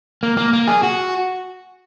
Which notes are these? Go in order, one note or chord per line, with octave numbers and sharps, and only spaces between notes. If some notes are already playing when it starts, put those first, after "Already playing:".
A#3
A#3
A#3
G#4
F#4